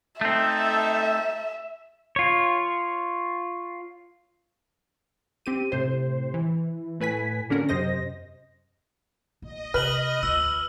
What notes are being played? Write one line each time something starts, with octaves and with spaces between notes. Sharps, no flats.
A3 C4 D#4 A4 E5
F4 C#5
C4 G4 D#7
A2 C3 C5
E3
A2 B4 G#5 B6
D3 A#3 C#4 F#4 A#4
F#2 C3 C5 D#5 A#6
A#1 D#5
C3 B4 F6 F#7
D2 F4 E6